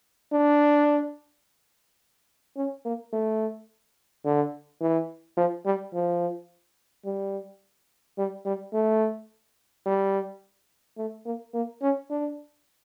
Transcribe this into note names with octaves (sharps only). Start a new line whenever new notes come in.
D4
C#4
A#3
A3
D3
E3
F3
G3
F3
G3
G3
G3
A3
G3
A3
A#3
A#3
C#4
D4